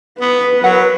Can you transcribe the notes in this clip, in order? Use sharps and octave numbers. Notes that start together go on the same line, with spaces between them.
B3 B4
F#3 A#4 F#5